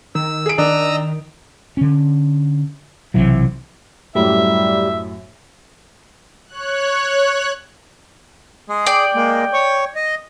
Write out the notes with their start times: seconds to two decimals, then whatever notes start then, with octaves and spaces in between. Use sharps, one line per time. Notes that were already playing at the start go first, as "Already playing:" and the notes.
0.15 D#3 E6
0.46 G#4 D7
0.58 D#3 D4 D#5 A#5 E6
1.77 D3 C#4
3.14 B1 C3 E3 F#3
4.15 F#2 A2 G3 E5
6.47 C#5 F#6
8.69 G#3 G#4
8.86 D5 G5
9.15 G#3 A#3
9.53 C#5 C#6
9.95 D#5